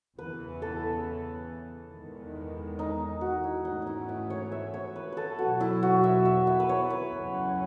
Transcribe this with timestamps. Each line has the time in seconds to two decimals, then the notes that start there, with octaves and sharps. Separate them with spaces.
0.18 E2 C#3 E3 B3 B4
0.62 A4
1.92 E2 D#3 G#3 B3
2.79 D#4
3.21 F#4
3.44 E4
3.65 G#2 E3 A3 C#4 D#4
3.82 D#4 E4
4.09 E4
4.30 C#5
4.52 E5
4.74 C#5
4.96 B4
5.12 A4 B4
5.38 E2 B2 F#3 B3 F#4
5.60 E4
5.83 F#4
6.04 E5
6.25 E5
6.47 E5
6.60 B4
6.69 C#5
6.90 B4
7.12 E2 C#3 F#3 C#4